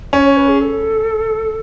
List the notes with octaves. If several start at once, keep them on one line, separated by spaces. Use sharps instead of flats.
C#4 C#5
C#5
B4
G#4
A4